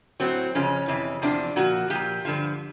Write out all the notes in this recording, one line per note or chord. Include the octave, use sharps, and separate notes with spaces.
A2 F#3 C4
F2 C#3 F3 C#4
F2 C3 E3
E2 C3 F3 D4
A#2 F3 F#4
A#2 F3 G4
G2 D3 F3